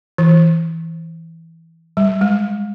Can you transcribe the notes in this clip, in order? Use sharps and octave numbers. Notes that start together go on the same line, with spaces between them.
E3
G3
G#3